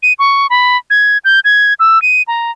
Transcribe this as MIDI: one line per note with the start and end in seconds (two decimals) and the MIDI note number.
0.03 0.13 99
0.19 0.47 85
0.50 0.77 83
0.90 1.18 92
1.25 1.40 91
1.45 1.74 92
1.80 2.01 88
2.02 2.22 99
2.28 2.51 82